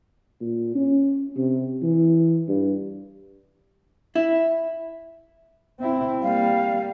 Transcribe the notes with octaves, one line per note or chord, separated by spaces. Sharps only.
A#2
C#4
C3
E3
G2
E4
C4 E4
G3 A#3 F5